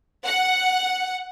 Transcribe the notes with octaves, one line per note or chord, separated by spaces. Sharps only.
F#5